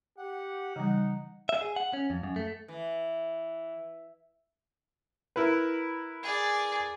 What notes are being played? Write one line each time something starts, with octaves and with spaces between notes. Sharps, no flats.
G4 F#5
C#3 E3 G3 D#4
E5
G#4
F#5
C#4
F2
F#2
A3
E3
E4 A#4 B4
G#4 D5